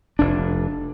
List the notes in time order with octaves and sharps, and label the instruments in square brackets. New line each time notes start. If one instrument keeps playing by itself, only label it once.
[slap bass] F1 D4